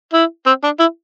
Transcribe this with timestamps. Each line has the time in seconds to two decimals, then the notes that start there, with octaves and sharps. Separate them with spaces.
0.13 E4
0.47 C4
0.64 D4
0.79 E4